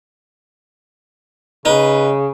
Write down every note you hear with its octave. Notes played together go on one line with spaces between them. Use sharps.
C#3 D#4 B4